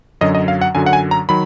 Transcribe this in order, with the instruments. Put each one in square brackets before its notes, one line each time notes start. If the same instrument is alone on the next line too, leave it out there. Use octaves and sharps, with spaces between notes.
[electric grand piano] F#2 D3 F#3 D#5
D#5
F5
F#5
F#2 D3 F#3 G#5
F#5
G#5
A#5
D#3 F#3 B5